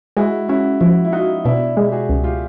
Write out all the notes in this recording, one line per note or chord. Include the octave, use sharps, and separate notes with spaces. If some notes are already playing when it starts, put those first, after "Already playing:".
G#3 E4 F#4
C#4 E4 F#4
F3 E4 F#4
E4
D#4 F4 F#4
B2 D4 E4
G#3
G4
F#4 G#4
C#2
F4 G4